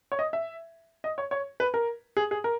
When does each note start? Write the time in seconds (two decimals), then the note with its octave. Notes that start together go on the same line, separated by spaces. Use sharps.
0.12 C#5
0.19 D#5
0.33 E5
1.04 D#5
1.18 C#5
1.31 C#5
1.60 B4
1.74 A#4
2.17 G#4
2.31 G#4
2.44 A#4